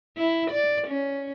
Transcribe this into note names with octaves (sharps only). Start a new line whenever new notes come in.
E4
D5
C#4